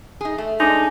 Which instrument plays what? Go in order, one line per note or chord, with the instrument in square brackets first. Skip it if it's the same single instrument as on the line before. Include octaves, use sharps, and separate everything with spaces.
[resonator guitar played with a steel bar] D#4 G#4
A3
[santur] G#3 D5 [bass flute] D4 [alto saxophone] D#4